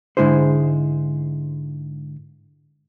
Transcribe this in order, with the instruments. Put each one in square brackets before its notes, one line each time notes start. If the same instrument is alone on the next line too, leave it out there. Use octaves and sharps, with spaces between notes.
[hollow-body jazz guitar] G#2 D3 G#3 E4 G#4 C5